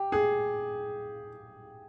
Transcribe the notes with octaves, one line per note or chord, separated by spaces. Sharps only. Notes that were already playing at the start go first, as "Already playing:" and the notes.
Already playing: G4
G#4